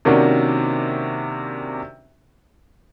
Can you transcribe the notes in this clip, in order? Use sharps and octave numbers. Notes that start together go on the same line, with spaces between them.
C3 D#3 A#3 C#4 D4 F#4